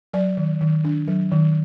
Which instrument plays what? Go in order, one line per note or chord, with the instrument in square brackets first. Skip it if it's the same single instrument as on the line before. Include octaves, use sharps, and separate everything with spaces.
[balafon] F#3 D5
D#3
D#3
D4
F#3
D#3